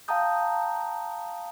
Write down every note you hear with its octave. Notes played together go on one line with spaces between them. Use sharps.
F5 G5 A5 A#5 D#6 G6